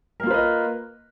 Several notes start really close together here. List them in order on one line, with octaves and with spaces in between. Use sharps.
A#4 A#3 F4 B4 D#5